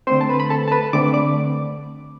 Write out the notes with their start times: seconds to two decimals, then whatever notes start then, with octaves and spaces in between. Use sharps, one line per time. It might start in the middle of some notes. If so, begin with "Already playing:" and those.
0.07 D3 A3 C4 C5 C6
0.21 A5
0.29 B4 B5
0.40 B5
0.50 A4 A5
0.68 A5
0.72 B4 B5
0.93 D3 A3 C4 D6
1.13 D5 D6